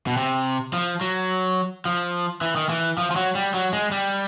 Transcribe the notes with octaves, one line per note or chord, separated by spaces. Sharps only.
B2
C3
F3
F#3
F3
E3
D#3
E3
F3
F3
F#3
G3
F#3
G#3
G3